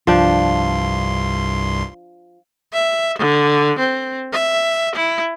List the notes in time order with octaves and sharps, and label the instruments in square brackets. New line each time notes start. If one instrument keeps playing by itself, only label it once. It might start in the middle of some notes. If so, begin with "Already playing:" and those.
[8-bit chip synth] C2 G2 C6 [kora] F3 D4 G5
[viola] E5
D3
C4
E5
E4